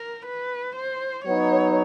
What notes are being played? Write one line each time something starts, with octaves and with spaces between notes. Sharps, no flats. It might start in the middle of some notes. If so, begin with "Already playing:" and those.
Already playing: A#4
B4
C5
F#3 B3 D#4 C#5